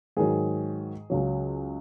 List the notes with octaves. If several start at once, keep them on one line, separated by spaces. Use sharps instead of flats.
G#2 D#3 F#3 G#4
C#2 C#3 F#3